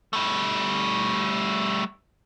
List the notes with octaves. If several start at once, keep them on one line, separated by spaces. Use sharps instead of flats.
G3 A3